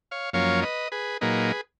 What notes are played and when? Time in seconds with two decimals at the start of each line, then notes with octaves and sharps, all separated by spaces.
0.11 C#5 F5
0.33 F#2 F3 A#3 C#4 C#5 F5
0.62 B4 D#5
0.92 G#4 B4
1.21 A#2 F#3 A#3 D#4 G#4 B4